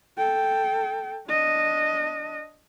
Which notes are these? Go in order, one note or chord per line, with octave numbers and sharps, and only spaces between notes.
A4 G5
D4 D#5